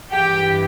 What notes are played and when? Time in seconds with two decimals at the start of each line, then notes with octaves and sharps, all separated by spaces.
0.11 G2 E3 G4 G5